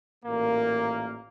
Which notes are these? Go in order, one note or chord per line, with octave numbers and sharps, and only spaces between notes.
A1 A#2 A#3